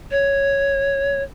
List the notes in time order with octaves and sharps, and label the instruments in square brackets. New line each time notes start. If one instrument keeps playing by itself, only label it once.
[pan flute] C#5